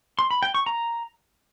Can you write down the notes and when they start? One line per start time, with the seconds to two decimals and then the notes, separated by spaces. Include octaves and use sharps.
0.19 C6
0.31 B5
0.43 G5
0.54 C#6
0.66 A#5